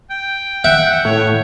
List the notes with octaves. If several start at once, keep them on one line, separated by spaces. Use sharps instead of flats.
G5
E5 F#5 G5
A2 C#5